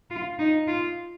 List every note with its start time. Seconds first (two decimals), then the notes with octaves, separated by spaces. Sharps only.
0.11 F4
0.39 D#4
0.68 F4